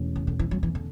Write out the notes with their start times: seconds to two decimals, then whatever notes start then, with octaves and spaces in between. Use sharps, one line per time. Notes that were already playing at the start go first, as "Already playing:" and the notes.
Already playing: E1 E2 B2 A3 C#4
0.16 C#3
0.27 D3
0.39 E3
0.51 F#3
0.63 E3
0.75 D3